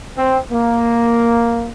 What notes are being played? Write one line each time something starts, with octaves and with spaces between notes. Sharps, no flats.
C4
A#3